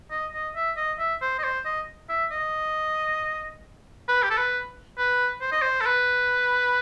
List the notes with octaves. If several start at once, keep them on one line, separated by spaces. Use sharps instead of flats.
D#5
D#5
E5
D#5
E5
C5
D#5
C5
D#5
E5
D#5
B4
G4
A4
B4
B4
C5
D#5
C5
A4
B4